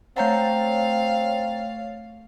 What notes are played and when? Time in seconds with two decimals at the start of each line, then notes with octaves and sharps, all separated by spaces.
0.17 A3 C4 C#5 F5 F#5 A#5 G6 A6